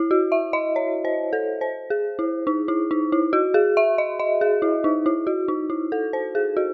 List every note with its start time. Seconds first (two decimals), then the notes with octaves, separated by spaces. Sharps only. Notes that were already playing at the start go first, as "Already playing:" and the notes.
Already playing: E4
0.11 F#4
0.32 E5
0.53 D#5
0.76 C#5
1.05 C5
1.33 A4
1.61 C5
1.90 G#4
2.19 E4
2.47 D#4
2.68 E4
2.91 D#4
3.12 E4
3.33 F#4
3.54 G#4
3.77 E5
3.98 D#5
4.19 D#5
4.41 G#4
4.62 E4
4.84 D#4
5.06 E4
5.27 F#4
5.48 D#4
5.70 E4
5.92 A4
6.13 C5
6.35 G#4
6.57 F#4